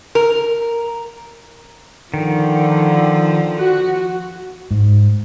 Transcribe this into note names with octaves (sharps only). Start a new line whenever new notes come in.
A#4
D3 D#3 F3
F#4
G#2